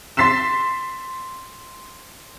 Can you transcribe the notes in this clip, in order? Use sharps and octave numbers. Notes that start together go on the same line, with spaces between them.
C6 A6 B6 C7 E7